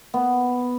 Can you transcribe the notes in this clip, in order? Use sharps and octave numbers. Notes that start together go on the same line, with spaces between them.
B3